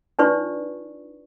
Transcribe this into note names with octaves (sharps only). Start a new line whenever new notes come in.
D4 D#4 F4 B4 D5 C#6